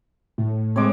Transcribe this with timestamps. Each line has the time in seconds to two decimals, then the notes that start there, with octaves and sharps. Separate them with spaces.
0.38 A2
0.76 G#3 C4 C#5 D6